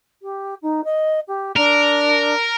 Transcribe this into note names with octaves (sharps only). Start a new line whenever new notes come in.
G4
D#4
D#5
G4
D4 A#4